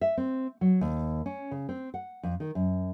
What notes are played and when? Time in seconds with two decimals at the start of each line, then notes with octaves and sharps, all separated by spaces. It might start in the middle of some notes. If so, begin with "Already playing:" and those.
0.01 E5
0.17 C4
0.61 F#3
0.81 D#2
1.26 C#4
1.51 C#3
1.69 C4
1.94 F#5
2.23 F2
2.40 D#3
2.55 F#2